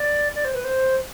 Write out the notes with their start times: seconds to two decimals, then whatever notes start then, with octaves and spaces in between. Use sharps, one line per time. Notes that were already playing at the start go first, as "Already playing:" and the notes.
Already playing: D5
0.35 D5
0.45 C5
0.54 B4
0.64 C5